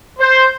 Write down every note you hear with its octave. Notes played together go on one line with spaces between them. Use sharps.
C5